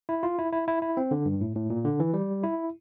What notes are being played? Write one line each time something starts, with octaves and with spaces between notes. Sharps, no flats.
E4
F4
E4
E4
E4
E4
C4
D3
G2
A2
A2
A#2
D3
E3
G3
E4